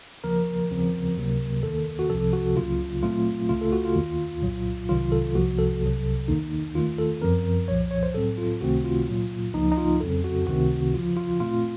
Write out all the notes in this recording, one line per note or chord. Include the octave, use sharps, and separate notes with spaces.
D#2 C#3 F3 A#3 A#4
D#2 C#3 F3 C4
C#2 C3 F#3 A#3
D#2 D#3 A#3 A4
F#4
C2 C3 F3 C4 A4
F#4
C#2 C#3 F#3 A#3 F4
A#2 F#3 A3 C4 F4
C#2 C#3 A3 F4
A4
F#4
F4
D#2 D#3 A#3
C2 A#2 F#3
C2 C3 D#3 F#3 F4
A4
C2 C3 F3 A#3 F#4
A4
C2 C3 F#3
D#2 D#3 A#3 D#4
D#2 D#3 A3 F4
A4
F#2 F3 C4 A#4
C2 A#2 F3 C#5
C#5
C5
A2 F#3 C4 A4
F4
C#2 C3 D#3 A3 C4 F#4
F4
A#2 F#3 A#3
C#2 C#3 F3 A#3 D#4
D#4
F4
F2 C#3 F#3 C4 A4
F#4
C#2 C3 D#3 A3 C4 F#4
D#2 C#3 F3 F4
F4
A#2 A3 C4 F4